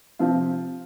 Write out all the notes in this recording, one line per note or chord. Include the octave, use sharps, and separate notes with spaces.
C3 F3 C4 F4